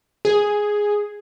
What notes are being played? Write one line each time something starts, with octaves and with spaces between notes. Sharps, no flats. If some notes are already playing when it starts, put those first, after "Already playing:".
G#4